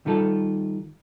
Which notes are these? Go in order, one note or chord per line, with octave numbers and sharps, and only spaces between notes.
D#3 G3 F4 A4